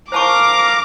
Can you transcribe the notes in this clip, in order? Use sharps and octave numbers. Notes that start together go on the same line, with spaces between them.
A#4 C5 F5 A5 A#5 C#6 D6